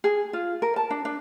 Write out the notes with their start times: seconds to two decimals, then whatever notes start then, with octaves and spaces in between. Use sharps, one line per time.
0.04 G#4
0.33 F4
0.62 A#4
0.76 A5
0.90 D4
1.05 D4